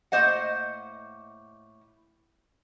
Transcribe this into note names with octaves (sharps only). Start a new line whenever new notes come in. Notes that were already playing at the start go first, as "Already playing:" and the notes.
A2 A#3 C5 D#5 F#5